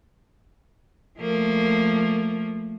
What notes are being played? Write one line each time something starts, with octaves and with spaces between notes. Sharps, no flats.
F3 A3 A#3